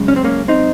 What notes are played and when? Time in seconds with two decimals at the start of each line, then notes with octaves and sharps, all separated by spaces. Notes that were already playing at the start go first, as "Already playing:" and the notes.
Already playing: F#2 C#3 G#3
0.08 C#4
0.16 C4
0.24 A#3 C#4
0.48 C4 D#4